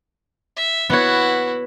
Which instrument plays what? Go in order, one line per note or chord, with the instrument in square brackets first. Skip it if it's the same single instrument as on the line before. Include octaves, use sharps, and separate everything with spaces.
[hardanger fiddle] E5
[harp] B3 C#5 [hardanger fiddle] E4 F#4